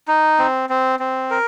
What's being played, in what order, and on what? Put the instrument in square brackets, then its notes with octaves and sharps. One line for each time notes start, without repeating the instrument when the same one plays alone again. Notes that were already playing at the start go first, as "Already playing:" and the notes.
[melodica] D#4
C4
C4
C4
A#4